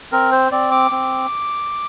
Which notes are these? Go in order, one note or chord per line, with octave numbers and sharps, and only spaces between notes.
C4 A#4
C5
C4 D5
D6
C4